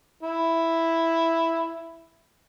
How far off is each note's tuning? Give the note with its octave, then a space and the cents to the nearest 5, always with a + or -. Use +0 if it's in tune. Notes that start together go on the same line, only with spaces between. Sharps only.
E4 +0